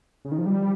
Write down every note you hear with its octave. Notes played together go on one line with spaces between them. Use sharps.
C#3
D#3
F3
G3